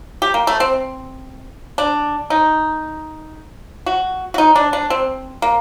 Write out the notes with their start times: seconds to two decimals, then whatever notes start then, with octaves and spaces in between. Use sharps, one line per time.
0.22 G4
0.34 A#3
0.47 A3
0.60 C4
1.78 D4
2.30 D#4
3.86 F#4
4.34 F#4
4.38 D#4
4.55 D4
4.73 D4
4.90 C4
5.42 A#3